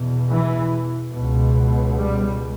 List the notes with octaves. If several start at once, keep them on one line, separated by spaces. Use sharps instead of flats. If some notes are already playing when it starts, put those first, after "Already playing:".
Already playing: E2 B2
E3
C#2 B2
G3